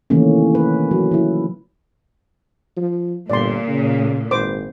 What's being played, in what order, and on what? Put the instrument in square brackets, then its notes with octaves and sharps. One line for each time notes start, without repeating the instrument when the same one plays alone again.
[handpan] C3 D#3 E3 A3 A#3 C#4
B4
F#3
F3 E4
[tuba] F3
[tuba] G1 [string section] A#2 [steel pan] D5 C6
[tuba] C#3
[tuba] G#1 [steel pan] B4 C5 D6